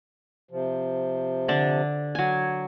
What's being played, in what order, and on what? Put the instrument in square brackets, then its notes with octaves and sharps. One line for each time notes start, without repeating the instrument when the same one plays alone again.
[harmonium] C3 F3
[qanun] D3 D4
F#3 G#5